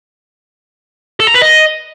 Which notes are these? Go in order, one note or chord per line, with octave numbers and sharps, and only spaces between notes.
A4
A#5
B4
D#5